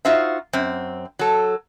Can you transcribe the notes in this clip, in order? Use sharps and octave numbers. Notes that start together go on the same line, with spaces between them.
D#4 F4 F#4 C5 E5
F#2 C4
F#3 A4